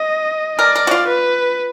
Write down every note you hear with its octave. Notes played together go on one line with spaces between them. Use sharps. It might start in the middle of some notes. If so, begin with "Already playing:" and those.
Already playing: D#5
A#4 D5
A#4
F#4
F4
B4